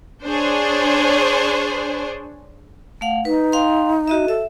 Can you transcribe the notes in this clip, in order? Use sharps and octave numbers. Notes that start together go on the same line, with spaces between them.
D4 G#4 C5 C#5
A3 F5 F#5
D#4 B4
F5 G5 C6
F#4 D#5 E5
A4 E5